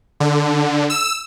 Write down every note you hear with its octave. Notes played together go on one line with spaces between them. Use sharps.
D3
E6